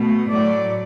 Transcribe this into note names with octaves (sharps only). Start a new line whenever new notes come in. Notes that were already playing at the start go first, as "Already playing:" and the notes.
Already playing: B2 A3
A2 F#3 A3 D5